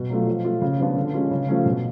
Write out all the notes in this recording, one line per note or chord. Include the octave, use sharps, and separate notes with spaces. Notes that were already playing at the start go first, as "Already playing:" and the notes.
Already playing: B2
F#3 A3 F4
F3
A3 F4
C#3
F3 B3 D4 F4
D3
G#3 C#4 F4
C#3
F3 A3 C#4
B2